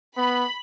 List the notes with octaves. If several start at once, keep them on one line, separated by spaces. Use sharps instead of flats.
B3 B5